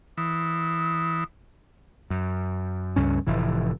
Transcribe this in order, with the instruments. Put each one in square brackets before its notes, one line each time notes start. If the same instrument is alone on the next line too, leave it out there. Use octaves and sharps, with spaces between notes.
[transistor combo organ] E3 [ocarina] D#6
[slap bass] F#2
C#2 G2 C#4
F1 A2 E3